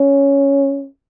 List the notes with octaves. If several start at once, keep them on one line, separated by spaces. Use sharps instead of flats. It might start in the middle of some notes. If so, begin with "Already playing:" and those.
Already playing: C#4